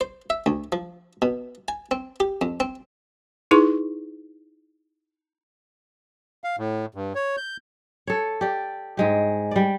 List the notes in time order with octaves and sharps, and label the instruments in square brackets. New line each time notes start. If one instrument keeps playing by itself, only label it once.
[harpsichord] C5
E5
D2
F3
B2
G#5
C4
G4
F2
C4
[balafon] D#4 E4 G#4 B4 C6 C#6
[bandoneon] F5
A2
G2
C#5
G6
[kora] A4 C#5
G4 D5
G#2 G#3 G4
G3 D5